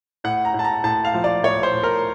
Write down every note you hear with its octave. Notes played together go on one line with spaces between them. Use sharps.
A2 F#5
A#5
A2
A5
A#5
A2 A5
F5
F3
D5
A2 C#5
C5
A2
A#4